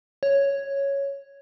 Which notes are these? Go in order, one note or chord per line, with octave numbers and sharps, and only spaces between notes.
C#5